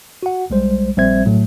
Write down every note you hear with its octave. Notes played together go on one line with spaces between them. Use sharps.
F#4 F#5
B1 G3 G#3 C5
A#1 G3 C4 C5 E5 G#6
A2 F#3 A3